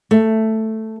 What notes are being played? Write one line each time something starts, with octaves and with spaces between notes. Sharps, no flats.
A3